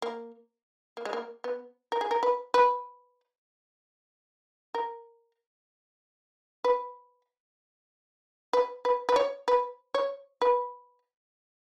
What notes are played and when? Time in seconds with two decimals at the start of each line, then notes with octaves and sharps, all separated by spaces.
0.02 A#3
0.97 A#3
1.05 G#3
1.13 A#3
1.44 B3
1.92 A#4
2.01 G#4
2.11 A#4
2.23 B4
2.54 B4
4.74 A#4
6.64 B4
8.53 B4
8.85 B4
9.09 B4
9.16 C#5
9.48 B4
9.94 C#5
10.42 B4